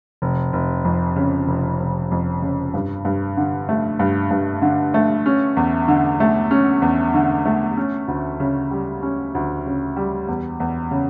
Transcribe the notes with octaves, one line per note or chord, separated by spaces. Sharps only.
F1
F1
F2
C#3
F1
F1
F2
C#3
G2
G2
D3
A3
G2
G2
D3
A3
C#4
E2
D3
A3
C#4
E2
D3
A3
C#4
D2
C#3
G3
C#4
D2
C#3
G3
E2
E2
C#3